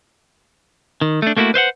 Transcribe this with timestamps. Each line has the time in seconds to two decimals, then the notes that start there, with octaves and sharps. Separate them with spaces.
1.01 D#3
1.22 A3 D4
1.37 A3 A#3 D#4 E4 F#4
1.54 B4 C5 E5 F#5